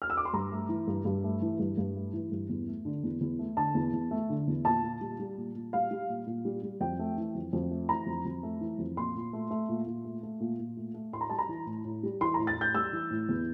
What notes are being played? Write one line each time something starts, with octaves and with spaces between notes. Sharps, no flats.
F6
E6
D6
C6
G2 A#5
A3
E3
G2
G2
A3
E3
G2
G2
A3
E3
G2
E2
A3
D3
E2
E2
A3
D3 A5
E2
E2
A3
D3
E2
A#2 A5
A#2
G3
G3
A#2
A#2
G3 F5
G3
A#2
A#2
G3
G3
F2 G5
A3
E3
F2
F2
A3
E3 A#5
F2
F2
A3
E3
F2
A#2 C6
A#2
A3
A3
A#2
A#2
A3
A3
A#2
A#2
A3
A3
A2 C6
A#5
G3 A5
A#5
E3
A2
A2
G3
E3 C6
A#5
A2
A6
A2 G6
G3 E6
E3
A2
E2